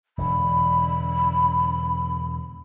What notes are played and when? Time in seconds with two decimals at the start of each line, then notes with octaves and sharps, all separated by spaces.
0.18 E1 D3 B5